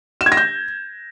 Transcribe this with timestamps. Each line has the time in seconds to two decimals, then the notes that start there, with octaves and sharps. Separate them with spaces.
0.21 E7
0.26 G#6
0.32 A#6
0.37 G6